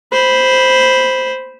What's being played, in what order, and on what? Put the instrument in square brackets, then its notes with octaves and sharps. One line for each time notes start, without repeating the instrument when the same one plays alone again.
[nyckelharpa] C5 B5